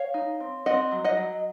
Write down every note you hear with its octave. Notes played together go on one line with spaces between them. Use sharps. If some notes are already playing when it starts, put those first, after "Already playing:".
Already playing: C#5 F5
D#4
C4
C4 D#5 F#5
F#3
D#5 F#5
F#3